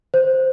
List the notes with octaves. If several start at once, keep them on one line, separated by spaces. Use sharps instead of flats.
C5